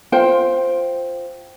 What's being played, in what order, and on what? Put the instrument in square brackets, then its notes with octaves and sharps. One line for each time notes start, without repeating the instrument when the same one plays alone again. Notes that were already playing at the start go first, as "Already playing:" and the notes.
[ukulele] F4 C5 G5